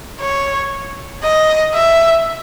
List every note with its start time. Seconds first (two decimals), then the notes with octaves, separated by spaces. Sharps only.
0.21 C#5
1.24 D#5
1.74 E5